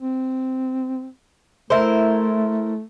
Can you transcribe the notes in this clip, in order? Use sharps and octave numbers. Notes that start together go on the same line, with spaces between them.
C4
A3 E4 A#4 C5